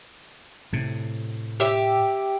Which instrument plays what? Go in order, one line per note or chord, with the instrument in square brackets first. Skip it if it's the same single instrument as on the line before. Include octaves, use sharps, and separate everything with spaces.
[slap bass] A2 C3
[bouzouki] G4 E5